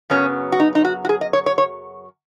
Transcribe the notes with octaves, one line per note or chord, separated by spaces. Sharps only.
F#2 C#3 F#3 B3 C#4
F#4
D#4
D#4
F#4
F#4
G#4
D#5
C#5
C#5
C#5